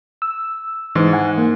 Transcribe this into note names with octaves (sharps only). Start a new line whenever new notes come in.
E6
G#2 E3
F#5 G#5
A#3